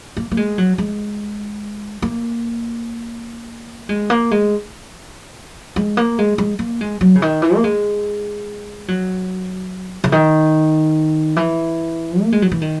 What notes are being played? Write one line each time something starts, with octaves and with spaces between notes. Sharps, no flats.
A#3
A#3
G#3
F#3
G#3
A#3
G#3
A#3
G#3
G#3
A#3
G#3
G#3
A#3
G#3
F#3
C#3
D#3
E3
A#3
G#3
F#3
C#3
D#3
E3
A#3
G#3
F#3
E3
D#3